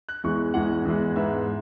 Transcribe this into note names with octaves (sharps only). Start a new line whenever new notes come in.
F#6
E2 E3 G#3 C#6
E2 E3 G#3 F#5
E2 E3 G#3
G#2 G#3 B3 E5